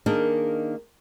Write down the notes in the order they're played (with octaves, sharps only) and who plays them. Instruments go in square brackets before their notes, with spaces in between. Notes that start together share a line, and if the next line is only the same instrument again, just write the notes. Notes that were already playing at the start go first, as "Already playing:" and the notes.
[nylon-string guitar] D#3 A#3 D4 D#4 G#4 A#4